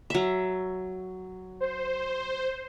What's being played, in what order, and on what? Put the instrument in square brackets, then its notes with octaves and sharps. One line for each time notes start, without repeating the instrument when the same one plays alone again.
[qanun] F#3 E5
[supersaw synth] C5